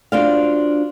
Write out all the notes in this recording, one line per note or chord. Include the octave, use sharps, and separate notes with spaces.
D4 F4 F#4 C5 D5 F5